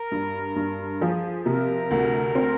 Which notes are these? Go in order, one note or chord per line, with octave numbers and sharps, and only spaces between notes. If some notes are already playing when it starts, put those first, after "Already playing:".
Already playing: A#4
G2
G2
F3 G#4
C3 A#4
D2
C4